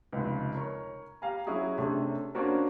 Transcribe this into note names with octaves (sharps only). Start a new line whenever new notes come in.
F1 C#2
A#4 C#5
G4 F5 G#5 A#5
F#3 C#4 E4 F#4 G#4
C3 A3 C#4 D4
A#3 C#4 D4 F#4 A#4 C5